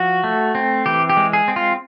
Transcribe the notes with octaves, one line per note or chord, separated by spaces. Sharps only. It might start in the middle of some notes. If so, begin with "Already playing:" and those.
Already playing: F3 F#4
A3
C4
E3 G4
G4
G#3
G#4
C4
F4